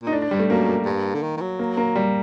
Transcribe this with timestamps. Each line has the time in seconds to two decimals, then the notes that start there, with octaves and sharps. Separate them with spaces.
0.03 A#2 D#4
0.12 A2 D4
0.22 D4
0.31 G2 G3
0.40 A3
0.50 F#2 A#3
0.85 G2
1.14 D3
1.23 D#3
1.37 D#3
1.41 F#3
1.59 A#3
1.77 A#3
1.96 G3